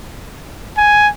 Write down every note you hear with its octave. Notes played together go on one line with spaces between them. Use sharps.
G#5